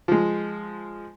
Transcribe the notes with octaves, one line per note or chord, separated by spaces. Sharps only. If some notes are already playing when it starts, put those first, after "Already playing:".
F3 G#3